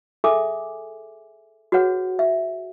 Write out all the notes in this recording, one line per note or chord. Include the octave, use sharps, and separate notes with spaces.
G#4 A4 E5 G#5 D6
F#4 G#4 B4 C#5 F#5
E5